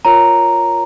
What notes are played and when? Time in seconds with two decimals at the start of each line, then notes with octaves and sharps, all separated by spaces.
0.05 F4 A#4 C#5 A#5